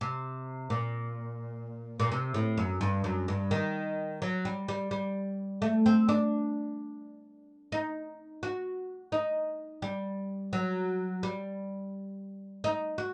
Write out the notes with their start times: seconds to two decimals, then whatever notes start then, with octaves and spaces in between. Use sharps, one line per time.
0.01 C3
0.70 A#2
2.00 A#2
2.12 C3
2.34 A2
2.57 F#2
2.81 G2
3.04 F#2
3.28 G2
3.51 D#3
4.22 F#3
4.45 G3
4.69 G3
4.91 G3
5.62 A3
5.86 C4
6.09 D4
7.72 D#4
8.43 F#4
9.12 D#4
9.82 G3
10.53 F#3
11.23 G3
12.64 D#4
12.98 F#4